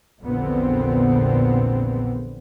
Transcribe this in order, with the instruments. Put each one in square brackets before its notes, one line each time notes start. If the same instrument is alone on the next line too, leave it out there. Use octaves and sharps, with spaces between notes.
[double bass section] A#1 E2 A#2 D3 B3 C4